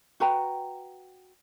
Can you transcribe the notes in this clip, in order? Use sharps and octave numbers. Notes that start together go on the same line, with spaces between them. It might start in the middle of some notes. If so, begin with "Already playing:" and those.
F#4 B4 G5 A#5